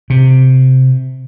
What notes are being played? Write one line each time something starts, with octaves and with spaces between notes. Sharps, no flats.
C3